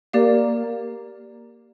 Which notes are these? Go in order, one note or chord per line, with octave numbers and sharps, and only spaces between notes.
A#3 G4 D5 F5